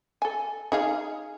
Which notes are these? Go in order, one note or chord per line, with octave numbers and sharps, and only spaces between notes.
A4 G#5
D#4 G#4 F5